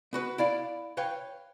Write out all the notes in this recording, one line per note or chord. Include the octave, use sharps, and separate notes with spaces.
B3 F#4 B4
E4 D5 F5
B4 C#5 F5 G5